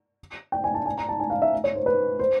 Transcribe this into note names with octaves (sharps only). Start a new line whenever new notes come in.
G5
G#5
A5
G#5
A#5
A5
G#5
F5
E5
C#5
C5
B4
C5